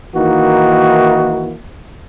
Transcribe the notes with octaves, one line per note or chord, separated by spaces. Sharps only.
D#3 E3 A#3 D#4 E4 F#4